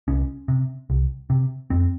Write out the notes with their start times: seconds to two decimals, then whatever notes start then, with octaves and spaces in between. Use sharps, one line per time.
0.08 C2 C#4
0.48 C3
0.90 C2
1.30 C3
1.70 F2 C4